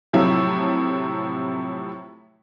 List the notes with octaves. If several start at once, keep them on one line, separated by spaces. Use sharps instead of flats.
A2 C3 F3 F#3 A3 E4